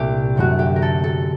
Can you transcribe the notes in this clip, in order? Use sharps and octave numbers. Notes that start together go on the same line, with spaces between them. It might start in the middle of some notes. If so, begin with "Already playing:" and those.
Already playing: C2 A#2 A3 G4
F#2 D3 F#3 A3 F#4
G4
A#4
A4
A4